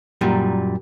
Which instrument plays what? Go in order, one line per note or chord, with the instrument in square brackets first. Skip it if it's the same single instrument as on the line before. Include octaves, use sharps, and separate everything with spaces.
[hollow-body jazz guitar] F#2 A#2 G3